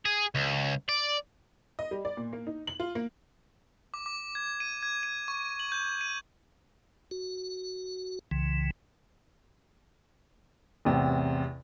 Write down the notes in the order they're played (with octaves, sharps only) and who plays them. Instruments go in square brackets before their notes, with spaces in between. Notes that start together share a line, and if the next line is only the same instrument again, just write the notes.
[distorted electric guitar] G#4
C#2
D5
[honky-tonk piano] D#5
G3
D5
A#2
A#3
D#4
F#7
F4
A#3
[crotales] D6
D6
G#6
D#7
G#6
D#7
C#6
F#7
G6
D#7
[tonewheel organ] F#4
C2 C#3 E3
[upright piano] A1 E2 C3